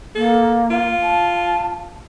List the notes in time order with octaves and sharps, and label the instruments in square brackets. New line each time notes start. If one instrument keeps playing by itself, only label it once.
[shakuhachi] A#3 [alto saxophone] A4
[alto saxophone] F4
[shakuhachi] A5